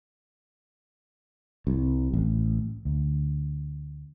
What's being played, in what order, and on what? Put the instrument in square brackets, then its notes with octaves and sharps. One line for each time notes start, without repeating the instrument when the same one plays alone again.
[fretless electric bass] C2
A1
[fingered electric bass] D2